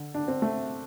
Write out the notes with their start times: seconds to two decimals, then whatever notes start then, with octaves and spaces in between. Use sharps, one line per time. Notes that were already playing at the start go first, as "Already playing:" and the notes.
Already playing: D3
0.14 D4
0.28 C4
0.42 A3